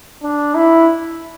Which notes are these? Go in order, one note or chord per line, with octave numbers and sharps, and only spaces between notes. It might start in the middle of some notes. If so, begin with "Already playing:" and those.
D4
E4